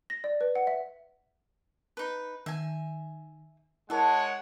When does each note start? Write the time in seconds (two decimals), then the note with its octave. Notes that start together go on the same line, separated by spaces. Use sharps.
0.10 A#6
0.24 D5
0.41 B4
0.55 F#5
0.67 E5
1.97 D#4 B4
2.46 D#3 E5 G#5
3.90 G#3 E4 A#4 C#5 E5 F#5 A5